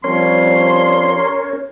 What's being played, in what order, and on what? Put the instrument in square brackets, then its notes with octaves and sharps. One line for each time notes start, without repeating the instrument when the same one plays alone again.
[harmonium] F3 G3 C4 [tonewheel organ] C#4 A#4 C#5 [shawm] C6